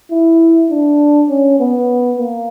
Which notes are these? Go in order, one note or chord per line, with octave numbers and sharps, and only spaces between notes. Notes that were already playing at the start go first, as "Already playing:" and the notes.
E4
D4
C#4
B3
A#3